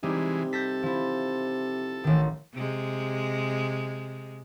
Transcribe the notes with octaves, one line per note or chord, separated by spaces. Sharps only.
C3 E3 G3 G#3 D#4
A4 G6 A#6 B6
F3 E4
A1 D#3
C3 G#3